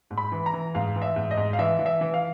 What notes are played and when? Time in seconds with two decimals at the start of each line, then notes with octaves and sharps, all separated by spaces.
0.10 G#2
0.18 B5
0.32 E3
0.46 A#5
0.54 E3
0.75 G#2 F5
0.96 E3
1.02 E5
1.16 G#2
1.31 D#5
1.37 G#2
1.53 F5
1.59 E3 E5
1.79 E3
1.86 E5
2.01 E3
2.14 F5